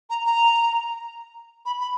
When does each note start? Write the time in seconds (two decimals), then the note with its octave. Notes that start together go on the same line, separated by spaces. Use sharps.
0.10 A#5
0.26 A#5
1.66 B5
1.80 B5